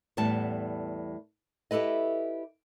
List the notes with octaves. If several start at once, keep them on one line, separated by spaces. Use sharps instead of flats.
E2 A2 G3 B3 A5
E4 G4 A4 B4 D#5